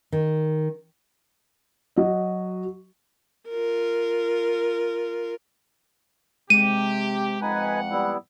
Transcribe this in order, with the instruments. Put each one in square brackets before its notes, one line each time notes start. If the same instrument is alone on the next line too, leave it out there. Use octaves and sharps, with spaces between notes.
[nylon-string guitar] D#3
[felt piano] F#3 D#5
[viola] F4 A#4
[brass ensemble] C3 G4 [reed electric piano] G#3 [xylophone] D#7
[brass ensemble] F2 F#5 [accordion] D#4 B4 G#5
[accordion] G3 B3 E4